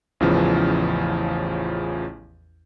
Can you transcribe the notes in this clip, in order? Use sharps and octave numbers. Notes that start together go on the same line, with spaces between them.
A1 E2 C#3 E3 F3